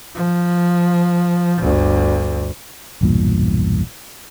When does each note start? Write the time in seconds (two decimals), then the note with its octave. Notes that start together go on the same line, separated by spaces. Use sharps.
0.15 F3
1.60 G1 D2
3.01 B1 E2 G2 A#2